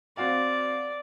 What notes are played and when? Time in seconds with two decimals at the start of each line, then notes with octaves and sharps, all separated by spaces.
0.17 C4 F#4 D5 F5